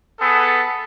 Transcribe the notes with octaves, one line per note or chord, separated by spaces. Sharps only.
B3 G#4 A4